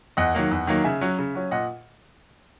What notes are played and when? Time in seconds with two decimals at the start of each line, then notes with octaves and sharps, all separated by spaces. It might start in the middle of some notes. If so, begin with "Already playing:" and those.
0.17 E2 D#5 F#5
0.35 D#3 F#3 A#3
0.51 E2
0.67 D#3 F#3 A#3
0.84 C#3 E5 G#5
1.01 F#3 C#4
1.19 C#3
1.35 F#3 C#4
1.51 A#2 D#5 F#5